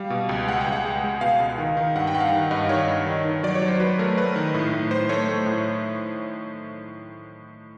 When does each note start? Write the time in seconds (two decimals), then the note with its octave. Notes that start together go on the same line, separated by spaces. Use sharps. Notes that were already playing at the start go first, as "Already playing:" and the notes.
Already playing: G3 F5
0.10 B2
0.29 C#2
0.48 G#3 F#5
0.61 G5
0.66 C#2
0.72 F#5
0.85 G#3
1.04 G#3
1.21 B2 F5
1.40 C#2
1.58 D#3
1.77 D#3
1.96 G2 F#5
2.07 G5
2.15 G2 F#5
2.20 F5
2.32 D#3
2.51 G2 D#5
2.69 D#3 C#5
2.87 G2
3.06 D#3
3.25 D#3
3.43 F#3 D5
3.55 C#5
3.62 F#3
3.68 C5
3.80 F#3 B4
3.99 A3 A#4
4.17 A3 B4
4.36 D#3
4.54 A2
4.73 A2
4.91 A2 C5
5.09 A3 C#5
5.29 A3
5.46 A2